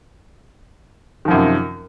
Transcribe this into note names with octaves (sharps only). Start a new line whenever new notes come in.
F#2 C3 D#3 F3